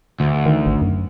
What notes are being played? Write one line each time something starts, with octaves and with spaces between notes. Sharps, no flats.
D2
D#3
G#1
F#2